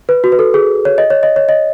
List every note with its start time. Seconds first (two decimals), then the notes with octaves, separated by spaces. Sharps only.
0.09 B4
0.24 F#4
0.32 B4
0.39 A4
0.54 G#4
0.85 C#5
0.98 D#5
1.10 C#5
1.23 D#5
1.36 C#5
1.49 D#5